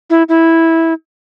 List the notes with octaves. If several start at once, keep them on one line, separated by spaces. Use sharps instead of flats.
E4
E4